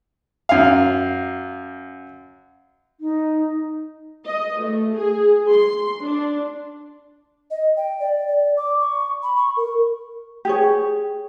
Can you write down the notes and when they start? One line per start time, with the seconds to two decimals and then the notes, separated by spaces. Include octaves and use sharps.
0.49 F#2 F5
3.00 D#4
4.26 D#5
4.61 A3
4.95 G#4
5.51 C6
6.03 D4
7.51 D#5
7.77 G5
8.00 D5
8.28 D5
8.57 D6
8.80 C#6
9.23 B5
9.36 C#6
9.57 A#4
10.45 G4 G#4 C#5